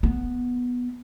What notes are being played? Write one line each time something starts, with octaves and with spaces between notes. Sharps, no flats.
B3